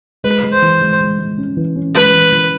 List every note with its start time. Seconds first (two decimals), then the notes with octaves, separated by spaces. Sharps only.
0.24 G#3 B4
0.43 G#3
0.52 C5
0.62 E3
0.81 G#3
1.01 G#3
1.19 G#3
1.38 C#4
1.57 E3
1.76 C#4
1.95 G#3 B4
2.14 E3
2.32 E3